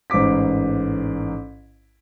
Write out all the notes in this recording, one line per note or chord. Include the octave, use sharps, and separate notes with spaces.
A1 G#2 C5 D6 B6